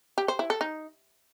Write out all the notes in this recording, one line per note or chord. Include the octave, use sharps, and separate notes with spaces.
G4
C5
E4
A4
D#4